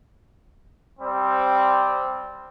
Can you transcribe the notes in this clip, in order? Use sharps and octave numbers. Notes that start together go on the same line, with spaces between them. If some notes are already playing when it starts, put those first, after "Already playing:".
G3 C4